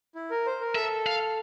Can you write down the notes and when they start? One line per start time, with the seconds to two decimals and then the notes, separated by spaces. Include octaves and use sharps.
0.15 E4
0.31 A#4
0.46 C5
0.61 A#4
0.75 A4 E5
1.06 F5